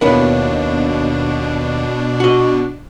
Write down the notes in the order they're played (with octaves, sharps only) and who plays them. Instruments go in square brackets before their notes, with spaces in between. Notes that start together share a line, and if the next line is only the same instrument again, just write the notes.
[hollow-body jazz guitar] D#2 B3 E4 [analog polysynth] B2 D4 [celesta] A#4 C#5
[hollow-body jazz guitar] F#4 D#5